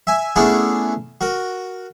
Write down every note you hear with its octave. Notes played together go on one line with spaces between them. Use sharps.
E5 G#5
A3 B3 C#4 D4 E4 G#4
F#4 A#4